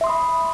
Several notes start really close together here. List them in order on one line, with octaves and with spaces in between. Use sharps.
E5 C6 D#6 B5